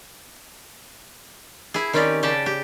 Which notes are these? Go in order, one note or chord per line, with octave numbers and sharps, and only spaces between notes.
E4 G#4
D#3 C4 C#4 G4 D5
C#3 G4 D5 G5 A5
G4